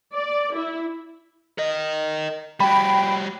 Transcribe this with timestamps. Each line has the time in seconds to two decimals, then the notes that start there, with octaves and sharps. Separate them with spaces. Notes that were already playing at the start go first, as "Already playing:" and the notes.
0.13 D5
0.54 E4
1.58 A#4 D#5
2.60 G3 F#4 G5 B5